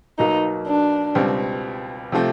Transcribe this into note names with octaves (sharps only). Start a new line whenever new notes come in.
B1 B2 F#3 A#3 D#4
D4
C#2 B2 G3 C4
C3 F3 A3 C4